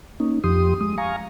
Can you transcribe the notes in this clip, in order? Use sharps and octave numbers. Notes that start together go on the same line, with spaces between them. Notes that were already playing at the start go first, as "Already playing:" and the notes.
A#3 C#4 D#4
F2 F3 G4 C6 D#6
G#3 D#6
F5 G#5 A#5 C#6